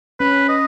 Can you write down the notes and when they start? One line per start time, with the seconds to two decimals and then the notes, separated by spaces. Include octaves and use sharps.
0.20 C#4 B4
0.49 D#5